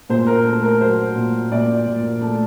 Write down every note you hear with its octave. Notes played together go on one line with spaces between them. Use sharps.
A#2 C5
A#4
A3 A#4
A#4
F#3 C5
A#2
A#2 D5
A#2
A3